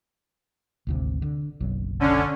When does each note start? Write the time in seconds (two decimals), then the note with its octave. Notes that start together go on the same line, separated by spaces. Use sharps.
0.87 G#1 D2 C3
1.22 D3
1.61 F#1 B1 F#3
2.00 D3 C#4